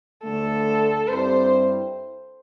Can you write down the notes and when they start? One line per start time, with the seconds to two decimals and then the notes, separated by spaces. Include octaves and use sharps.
0.24 D2 D3 A3 A4
1.08 G2 G3 C4 E4 G4 C5